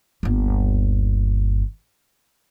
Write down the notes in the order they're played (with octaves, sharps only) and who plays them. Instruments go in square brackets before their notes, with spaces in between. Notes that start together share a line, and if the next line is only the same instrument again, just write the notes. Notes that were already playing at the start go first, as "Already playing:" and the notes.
[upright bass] G1 D#2